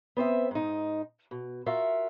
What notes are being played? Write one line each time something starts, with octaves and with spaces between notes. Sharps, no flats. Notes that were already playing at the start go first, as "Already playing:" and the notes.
B3 C4 C5 E5
G#2 D#4
B2
F4 F#4 A#4 E5